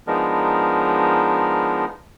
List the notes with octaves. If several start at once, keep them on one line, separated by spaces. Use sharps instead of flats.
F3 G#3 B3 D4 D#4 A#4